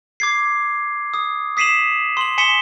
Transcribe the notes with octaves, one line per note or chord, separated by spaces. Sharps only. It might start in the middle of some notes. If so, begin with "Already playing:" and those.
D6 G#6 C7
D#6
D#6 B6 C7 D#7 E7 F#7
C6 F#7
G#5 C6 B6 C#7 E7 G7